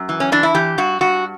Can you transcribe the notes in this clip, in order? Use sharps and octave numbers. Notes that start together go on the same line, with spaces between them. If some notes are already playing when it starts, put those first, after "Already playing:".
Already playing: F#2
E3
C#4
E3 D4
E4
E3 G4
G2 F#4
G2 F#4